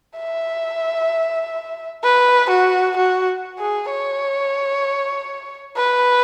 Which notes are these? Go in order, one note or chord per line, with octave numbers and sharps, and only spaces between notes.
E5
B4
F#4
F#4
G#4
C#5
B4